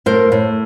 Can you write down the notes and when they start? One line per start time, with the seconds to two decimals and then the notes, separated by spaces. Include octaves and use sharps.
0.06 A2 A#4 C5
0.32 A2